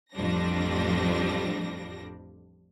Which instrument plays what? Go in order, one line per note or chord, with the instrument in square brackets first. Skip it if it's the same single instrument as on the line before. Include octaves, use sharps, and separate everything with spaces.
[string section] A1 F2 F3 G3 D4 A#6